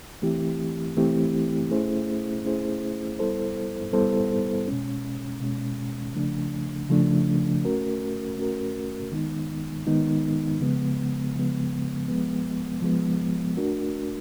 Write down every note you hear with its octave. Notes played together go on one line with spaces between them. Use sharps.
E3 A3 C4 E4 G4
E3 A3 C4 E4 G4
A3 C#4 E4 G#4 C5
A3 C#4 E4 G#4 C5
G3 B3 E4 A4 C5
G3 B3 E4 A4 C5
B2 G#3 C#4
B2 G#3 C#4
C#3 F3 A3 D4
C#3 F3 A3 D4
A3 C#4 F#4 A#4
A3 C#4 F#4 A#4
D#3 G#3 B3 D#4
D#3 G#3 B3 D#4
C#3 F3 G#3 B3
C#3 F3 G#3 B3
F3 G#3 B3
F3 G#3 B3
A3 D4 F#4 A#4